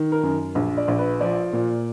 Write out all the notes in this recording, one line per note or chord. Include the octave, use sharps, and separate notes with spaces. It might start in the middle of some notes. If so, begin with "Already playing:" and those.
Already playing: D#3
A#4
F#2
A#1
D5
A#1
B4
F3 D5
A#2